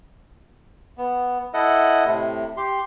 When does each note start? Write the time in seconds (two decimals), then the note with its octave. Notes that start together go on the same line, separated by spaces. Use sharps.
0.98 B3
1.54 E4 A4 D#5 F#5
2.05 A2 C3
2.57 G4 C6